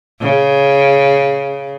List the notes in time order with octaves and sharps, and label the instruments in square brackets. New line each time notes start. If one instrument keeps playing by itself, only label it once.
[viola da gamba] C#3